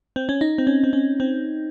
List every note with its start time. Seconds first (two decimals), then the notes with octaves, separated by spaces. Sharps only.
0.16 C4
0.29 C#4
0.41 D#4
0.58 C4
0.67 C#4
0.84 C4
0.93 C#4
1.20 C4